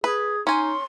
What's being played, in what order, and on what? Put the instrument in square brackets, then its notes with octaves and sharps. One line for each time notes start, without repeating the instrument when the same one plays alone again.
[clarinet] G#4 [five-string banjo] B4
[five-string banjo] C#4 G#5 [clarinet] D#4 [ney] C6